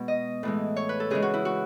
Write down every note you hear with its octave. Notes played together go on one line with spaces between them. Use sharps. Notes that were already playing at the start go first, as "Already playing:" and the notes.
Already playing: B2 G#3
D#5
A2 E3 G#3
C#5
B4
A4
C#3 E3 G#3 G#4
F#4
E4
F#4